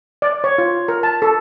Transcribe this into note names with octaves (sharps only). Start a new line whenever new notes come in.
D5
C#5
F4
A#4
A5
A4